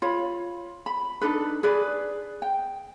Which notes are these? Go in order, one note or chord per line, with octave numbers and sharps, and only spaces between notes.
F4 C#5 B5
B5
D4 D#4 A4 B4
G#4 B4 D5
G5